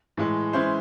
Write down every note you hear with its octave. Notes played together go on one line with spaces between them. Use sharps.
A2 E3 G#3
E3 G#3 C#4 E4 C5